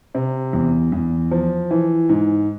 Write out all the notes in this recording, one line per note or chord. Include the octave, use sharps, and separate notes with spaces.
C3
E2
E2
F3
E3
G#2